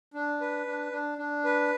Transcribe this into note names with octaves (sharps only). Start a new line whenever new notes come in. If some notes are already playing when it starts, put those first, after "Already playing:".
D4
B4
D4
D4
D4
B4